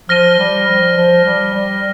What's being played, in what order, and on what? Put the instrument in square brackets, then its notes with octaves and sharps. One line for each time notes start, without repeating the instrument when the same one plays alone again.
[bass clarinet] F3 [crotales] F6 A#6 D#7 G7
[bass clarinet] G3
F3
F3
G3
G3